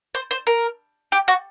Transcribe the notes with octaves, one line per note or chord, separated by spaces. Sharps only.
C5
C5
A#4
G4
F#4